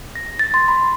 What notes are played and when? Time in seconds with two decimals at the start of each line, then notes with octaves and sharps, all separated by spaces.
0.16 A#6
0.39 A6
0.54 C6
0.68 B5